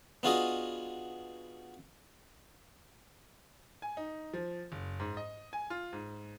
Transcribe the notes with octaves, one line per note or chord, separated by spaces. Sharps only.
B3 D4 F4 F#4 G#4 D#5
G#5
D#4
F3
F#1
G#2
D#5
G#5
F4
G#2